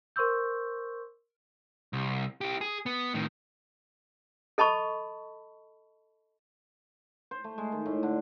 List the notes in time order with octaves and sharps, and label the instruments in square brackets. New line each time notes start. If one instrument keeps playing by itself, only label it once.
[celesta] A#4 C5 C6 C#6 E6 G6
[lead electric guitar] C2
E4 G4
G#4
B3
A2 D#3
[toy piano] A4 D#5 A5 B5 C#6
[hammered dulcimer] C5
A3
G#3
D#3
A2
D3